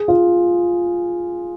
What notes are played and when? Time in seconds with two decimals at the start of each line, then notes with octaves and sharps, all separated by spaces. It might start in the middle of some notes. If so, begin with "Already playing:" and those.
Already playing: G#4
0.08 F4